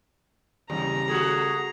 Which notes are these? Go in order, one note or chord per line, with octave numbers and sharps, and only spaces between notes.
D#2 C#3 G3 A#5
A3 F#4 G#4